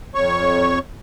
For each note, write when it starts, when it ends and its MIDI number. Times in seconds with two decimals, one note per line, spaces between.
0.14 0.79 41
0.14 0.79 73
0.14 0.79 85